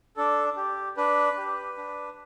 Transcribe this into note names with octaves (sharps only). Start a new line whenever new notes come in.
D4 A4
G4
D4 B4
G4
D4